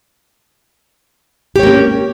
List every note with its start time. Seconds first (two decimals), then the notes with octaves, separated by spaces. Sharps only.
1.56 G4
1.59 C#5
1.63 A#3
1.67 C#4